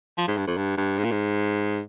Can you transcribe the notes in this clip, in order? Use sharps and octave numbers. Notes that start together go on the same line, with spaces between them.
F3
G#2
G2
F2
G2
G2
G#2
A#2
G#2